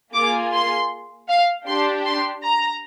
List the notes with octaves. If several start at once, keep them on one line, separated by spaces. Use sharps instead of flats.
A#3 F4 G#4 D6
C6
F5
D4 G4 C6
C6
A#5